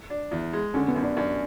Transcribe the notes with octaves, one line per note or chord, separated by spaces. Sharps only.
D4
E2
G#3
D3 C#4
B3
F#2
D4
F#2 D4